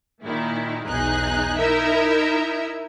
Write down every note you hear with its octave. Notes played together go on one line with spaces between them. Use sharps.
A#2 D#3 E4
B1 E2 D#4 G#4 F#6
D#4 E4 A#4 E5